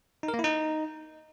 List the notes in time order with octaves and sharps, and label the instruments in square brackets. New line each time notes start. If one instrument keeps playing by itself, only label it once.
[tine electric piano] D#4
A#4
A#3
E4
D#4